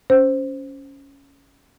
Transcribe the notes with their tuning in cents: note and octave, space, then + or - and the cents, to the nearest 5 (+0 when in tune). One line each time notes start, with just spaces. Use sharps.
C#4 +5 C5 +0